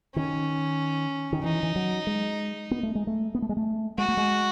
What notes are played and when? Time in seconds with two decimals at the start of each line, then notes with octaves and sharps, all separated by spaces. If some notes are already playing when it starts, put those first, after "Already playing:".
0.15 D#3 C#4
1.33 D#3
1.43 E3 D#4
1.63 E3
1.76 F#3
2.07 G#3
2.71 B3
2.83 A3
2.95 G#3
3.07 A3
3.35 B3
3.42 A3
3.49 G#3
3.57 A3
3.98 G#3 F#4
4.08 A3
4.17 G#3